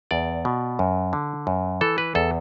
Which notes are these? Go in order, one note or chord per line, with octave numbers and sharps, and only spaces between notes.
E2 D5
B2
F#2
D3
F#2
E3 A4
B4
E2 A4